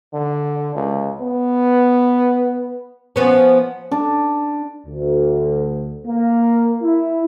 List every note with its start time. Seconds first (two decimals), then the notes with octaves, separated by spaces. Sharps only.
0.14 D3
0.75 C#2
1.21 B3
3.16 F3 B3 C#4
3.91 D4
4.87 D2
6.06 A#3
6.83 E4